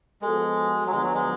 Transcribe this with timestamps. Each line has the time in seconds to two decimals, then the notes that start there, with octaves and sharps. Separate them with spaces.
0.22 F3 G#3 B3 F#4 A4
0.86 F#3
0.91 D2 D3 F3 G#3 B3 F4
1.03 F#3
1.15 G#3